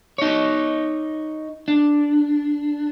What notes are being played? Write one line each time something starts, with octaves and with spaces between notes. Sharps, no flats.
D#4 C#5
D4